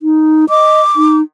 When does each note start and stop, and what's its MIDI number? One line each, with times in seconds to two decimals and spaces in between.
0.02 0.45 63
0.49 0.81 75
0.49 1.16 86
0.96 1.22 63